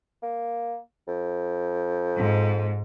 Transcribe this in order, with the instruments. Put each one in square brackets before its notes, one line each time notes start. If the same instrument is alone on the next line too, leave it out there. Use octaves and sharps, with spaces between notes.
[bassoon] A#3
F2
[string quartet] G#2